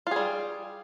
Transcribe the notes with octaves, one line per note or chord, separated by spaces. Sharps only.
G3 F4 G#4